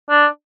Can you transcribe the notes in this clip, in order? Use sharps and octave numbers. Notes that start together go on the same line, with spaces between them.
D4